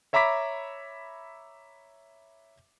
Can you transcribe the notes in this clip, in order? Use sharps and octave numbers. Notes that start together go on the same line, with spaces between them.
C#5 E5 A#5 B5 D6 B6